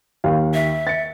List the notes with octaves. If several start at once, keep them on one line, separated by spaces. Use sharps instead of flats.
D#2 F5
E5
A6 C#7